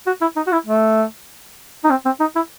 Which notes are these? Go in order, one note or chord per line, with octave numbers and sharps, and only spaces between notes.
F#4
E4
D#4
F#4
E4
A3
D#4
C4
C4
D#4
E4